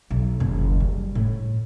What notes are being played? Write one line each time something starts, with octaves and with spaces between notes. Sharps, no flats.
B1
F#1 D#2
G3
A2